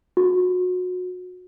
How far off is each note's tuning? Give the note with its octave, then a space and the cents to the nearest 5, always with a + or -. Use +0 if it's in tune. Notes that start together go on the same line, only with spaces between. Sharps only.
F#4 -30